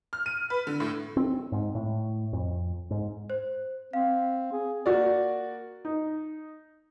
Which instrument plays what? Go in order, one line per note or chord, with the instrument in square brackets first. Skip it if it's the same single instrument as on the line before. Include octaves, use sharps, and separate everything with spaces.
[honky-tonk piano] F6
D#7
B4
D3
A2
[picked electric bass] C4
G#2
A2
F2
G#2
[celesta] C5
[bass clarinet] C4 [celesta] F5
[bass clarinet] G#4
[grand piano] A#3 F#4 D5
D#4